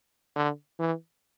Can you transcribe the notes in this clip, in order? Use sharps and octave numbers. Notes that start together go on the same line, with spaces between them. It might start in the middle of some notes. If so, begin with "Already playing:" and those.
D3
E3